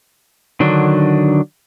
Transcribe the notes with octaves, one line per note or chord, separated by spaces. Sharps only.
D3 D#3 F#3 D4